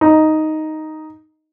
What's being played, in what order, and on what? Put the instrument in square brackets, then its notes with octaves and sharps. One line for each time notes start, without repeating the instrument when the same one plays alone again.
[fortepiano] D#4